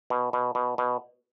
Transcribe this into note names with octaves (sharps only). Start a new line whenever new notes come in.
B2
B2
B2
B2